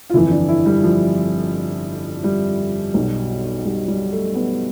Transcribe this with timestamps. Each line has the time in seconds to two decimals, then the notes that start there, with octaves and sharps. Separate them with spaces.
0.10 F4
0.13 G1 F2 E3 E4
0.31 D4
0.49 E4
0.66 G3
0.84 F3
2.24 G3
2.94 B1 B2
3.65 G3
3.88 G3
4.12 A3
4.35 B3